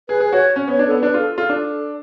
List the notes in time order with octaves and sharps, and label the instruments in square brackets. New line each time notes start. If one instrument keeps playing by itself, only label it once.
[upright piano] G#4 [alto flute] B4
[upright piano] G#4 [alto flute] B4
[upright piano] F#4 [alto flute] C#5
[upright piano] C#4
[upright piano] B3 [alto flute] C#5
[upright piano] D4
[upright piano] B3 [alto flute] A4
[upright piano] D4 [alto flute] B4
[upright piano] F4 [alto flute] A4
[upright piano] F4 [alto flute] A4
[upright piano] D4